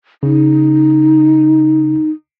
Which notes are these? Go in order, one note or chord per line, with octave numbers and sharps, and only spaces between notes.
C#3 D#4